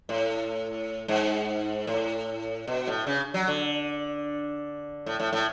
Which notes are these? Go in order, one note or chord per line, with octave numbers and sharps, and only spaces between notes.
A2
G#2
A2
B2
A2
C#3
F#3
D3
A2
A2
A2